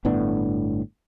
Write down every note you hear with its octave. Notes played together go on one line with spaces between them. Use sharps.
G1 A2 B3 D4